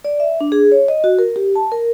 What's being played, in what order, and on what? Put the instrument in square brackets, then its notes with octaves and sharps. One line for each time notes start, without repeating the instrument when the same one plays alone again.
[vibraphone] D5
E5
D4
G#4
C#5
D#5
F#4
A#4
G4
A5
A#4